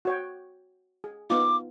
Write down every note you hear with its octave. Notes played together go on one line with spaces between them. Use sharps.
F#4 C#5 G5
G#4
B3 D#4 F4 D6